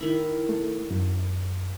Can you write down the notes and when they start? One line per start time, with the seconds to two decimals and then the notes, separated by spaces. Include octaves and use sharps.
0.01 D#3 E4
0.49 A3
0.91 F#2